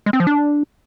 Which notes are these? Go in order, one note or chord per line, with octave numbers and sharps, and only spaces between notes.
G#3
C4
F3
D4